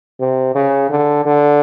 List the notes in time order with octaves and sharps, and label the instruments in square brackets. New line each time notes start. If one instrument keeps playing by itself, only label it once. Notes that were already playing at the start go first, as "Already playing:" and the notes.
[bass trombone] C3
C#3
D3
D3